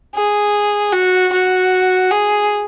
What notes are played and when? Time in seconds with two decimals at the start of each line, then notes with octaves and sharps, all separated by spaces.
0.15 G#4
0.92 F#4
1.32 F#4
2.11 G#4